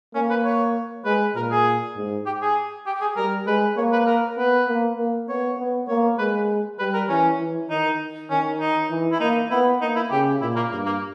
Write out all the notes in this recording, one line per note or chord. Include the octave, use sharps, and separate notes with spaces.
A#3 C#4
B4
C#5
G#3 B4
A#2 A#4
G#4
G#2
G4
G#4
G4
G#4
G3 A#4
G#3 B4
A#3 C#5
B4
A#4
B3 B4
A#3
A#3
B3 C#5
B3
A#3 C#5
G#3 B4
G3 B4
A#4
E3 C#4
E3
D#3 D#4
D#3 C#4
D#4
E3
E4
A#3 D#4
B3 E4
A#3 D#4
E4
C#3 G4
A#2 E4
A#3
G2 A#3
A#3